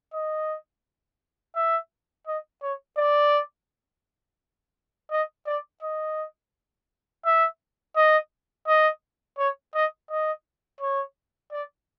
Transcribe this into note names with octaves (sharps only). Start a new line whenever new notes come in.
D#5
E5
D#5
C#5
D5
D#5
D5
D#5
E5
D#5
D#5
C#5
D#5
D#5
C#5
D5